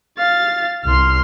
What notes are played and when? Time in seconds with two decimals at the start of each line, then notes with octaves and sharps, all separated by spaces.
0.18 F5 A6
0.84 C2 C6 F6